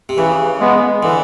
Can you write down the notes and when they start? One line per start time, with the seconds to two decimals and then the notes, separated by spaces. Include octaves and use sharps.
0.09 C3
0.17 C#3 E3
0.60 G#3 B3
1.03 D3 E3